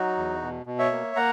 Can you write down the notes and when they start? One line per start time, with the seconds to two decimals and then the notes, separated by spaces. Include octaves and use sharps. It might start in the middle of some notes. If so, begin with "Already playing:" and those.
Already playing: F#3 D#4 F#4
0.17 E2
0.42 B2
0.66 B2
0.79 C#5 E5
0.91 A#3
1.16 A#3 F#5 A#5